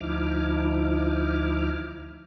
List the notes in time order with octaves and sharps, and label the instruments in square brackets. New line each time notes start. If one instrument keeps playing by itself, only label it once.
[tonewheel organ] D2 F3 D#4 E4 D6 F6